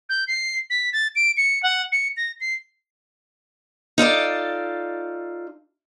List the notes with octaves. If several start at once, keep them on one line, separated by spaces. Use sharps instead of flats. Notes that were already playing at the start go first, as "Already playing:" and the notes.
G6
C7
B6
A6
D7
C#7
F#5
C#7
A#6
C7
D#4 F4 A4 D5